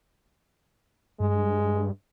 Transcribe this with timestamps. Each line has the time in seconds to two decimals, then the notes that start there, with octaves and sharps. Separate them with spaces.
1.20 G2 G#3